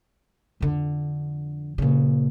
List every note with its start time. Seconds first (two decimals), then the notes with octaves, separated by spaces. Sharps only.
0.61 F2 D3
1.78 A#2 C#3